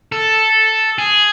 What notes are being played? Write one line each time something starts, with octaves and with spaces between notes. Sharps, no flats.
A4
G#4